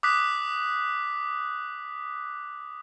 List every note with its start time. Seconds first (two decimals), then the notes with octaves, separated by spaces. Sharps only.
0.03 D6 D#6 F#6 B6